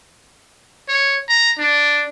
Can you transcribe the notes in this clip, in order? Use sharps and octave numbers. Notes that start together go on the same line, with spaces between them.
C#5
A#5
D4